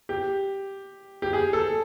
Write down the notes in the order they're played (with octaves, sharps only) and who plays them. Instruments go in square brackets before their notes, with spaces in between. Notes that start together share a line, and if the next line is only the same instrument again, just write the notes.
[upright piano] G4
G4
G#4
A4